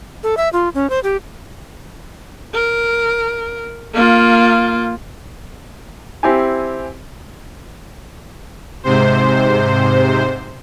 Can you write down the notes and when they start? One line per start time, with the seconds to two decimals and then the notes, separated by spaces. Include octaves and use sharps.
0.23 A4
0.37 E5
0.53 F4
0.75 C#4
0.90 C5
1.03 G4
2.54 A#4
3.94 A#3 F4
6.23 C4 E4 G4 G#5
8.83 G#2 C3 C5